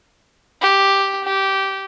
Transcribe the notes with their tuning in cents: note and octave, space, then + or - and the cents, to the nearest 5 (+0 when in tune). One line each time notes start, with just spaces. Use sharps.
G4 +0
G4 -15